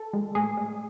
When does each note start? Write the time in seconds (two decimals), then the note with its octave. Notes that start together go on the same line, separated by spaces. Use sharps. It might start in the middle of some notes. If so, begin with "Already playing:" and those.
Already playing: A4
0.13 G#3
0.35 A2 G#4
0.57 G#3